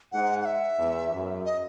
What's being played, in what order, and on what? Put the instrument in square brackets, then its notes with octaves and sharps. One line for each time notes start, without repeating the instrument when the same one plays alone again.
[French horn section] G#2 [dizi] F#5
[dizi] F#5
E5
[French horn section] E2
F#2
[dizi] D#5